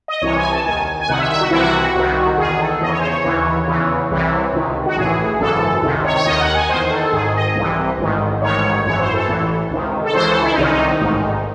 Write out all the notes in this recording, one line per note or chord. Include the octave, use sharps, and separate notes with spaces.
D#5
D#5
C2 C3 E3 C#5
G#5
A5
D#2 D#3 G#5
G#5
C2 C3 D#3 F#5
E5
E5
F#4
C2 C3 E3 E4
F#4
C2 C3 D#3
E2 D#3 G#4
A4
E2 C#3 E3 D#5
C#5
C5
C#5
D#2 C#3 E3
E2 C#3 E3
C2 C3 E3
C#2 C3 D#3
F#4
A1 A2 E3 G#4
G#1 F#2 C#3 E3 A4
C#2 C3 D#3
C#5
C#5
D#2 D#3 D#5
F#5
G#5
E2 D#3 C5
C5
A4
G#1 G#2 D#3 G#4
D#5
C2 C3 E3
A1 G#2 D#3
A1 G#2 D#3 C#5
G#1 F#2 E3 C#5
C5
A4
A1 A2 E3
C#2 C3 D#3
A4
C#2 C#3 E3 C5
A4
E4
D#4
C2 C3 D#3 C#4
D#4
A1 G#2 D#3